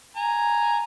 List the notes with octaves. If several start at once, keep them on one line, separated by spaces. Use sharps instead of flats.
G#5 A#5